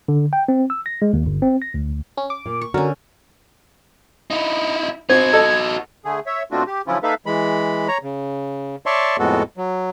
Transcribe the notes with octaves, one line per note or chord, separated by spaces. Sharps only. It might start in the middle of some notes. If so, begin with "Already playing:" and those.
D3
G5
C4
E6
A#6
G#3
D#2
G1
C4
A#6
D2
C#4
D6
A#2
C#6
D3 C#4 F#4 A#4
D#4 E4
C4 D#4 F#4 G#6
A4 D#5
D3 A3 G#4
C#5 E5
B2 A3 C4 D4 F4 F#4
G4
D3 F3 F#3 C#4 E4 F4
A#3 D#4 A4 B4 E5 F5
E3 G#3 B5
C#5 A#5
C#3
C#5 D5 E5 A5 C6 C#6
F2 A2 G#3 B3 F#4 A4
F#3